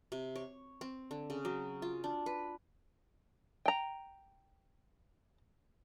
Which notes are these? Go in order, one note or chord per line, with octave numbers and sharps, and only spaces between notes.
C3
C#5
C4
D3
C#3
F#3
F4
D4
B4
G5 A#5